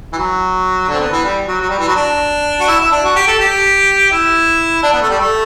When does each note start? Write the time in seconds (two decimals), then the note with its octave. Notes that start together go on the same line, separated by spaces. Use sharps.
0.13 E3
0.17 F#3
0.88 D3
0.94 C4
1.00 B3
1.12 E3
1.24 G3
1.48 F#3
1.60 F#3
1.69 G3
1.79 E3
1.88 F#3
1.95 D4
2.60 F#4
2.68 E4
2.80 E4
2.92 D4
3.04 F#4
3.16 G4
3.27 A4
3.39 G4
4.11 E4
4.83 D4
4.92 B3
5.01 A3
5.10 G3
5.19 A3